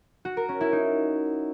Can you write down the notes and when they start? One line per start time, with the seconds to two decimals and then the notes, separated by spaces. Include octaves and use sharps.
0.25 F#4
0.37 A#4
0.49 C#4
0.61 E4
0.72 D#4